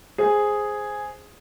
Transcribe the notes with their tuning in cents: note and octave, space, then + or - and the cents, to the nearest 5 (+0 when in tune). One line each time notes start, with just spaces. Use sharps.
G#4 +0 C5 +0